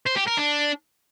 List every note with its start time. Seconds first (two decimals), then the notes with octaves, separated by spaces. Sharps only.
0.06 C5
0.16 G4
0.27 A#4
0.37 D4